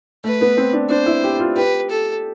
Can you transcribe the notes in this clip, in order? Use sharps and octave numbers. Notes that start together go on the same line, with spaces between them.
A3 B4
B3
C4
D4
D4 C5
E4
G4
F4
G4 B4
A4